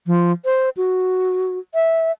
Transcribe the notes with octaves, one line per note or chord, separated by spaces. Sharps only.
F3
C5
F#4
E5